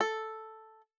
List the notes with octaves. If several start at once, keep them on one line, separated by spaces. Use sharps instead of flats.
A4